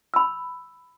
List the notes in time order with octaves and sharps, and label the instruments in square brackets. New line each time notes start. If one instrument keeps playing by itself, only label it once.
[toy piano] B5 E6